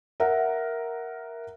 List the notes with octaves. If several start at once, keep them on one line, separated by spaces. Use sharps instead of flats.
A#4 E5 F#5